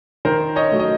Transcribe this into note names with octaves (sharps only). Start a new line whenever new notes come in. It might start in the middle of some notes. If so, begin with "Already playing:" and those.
D#3 A#4 C5
C#5 D#5
F#3 A3
D#5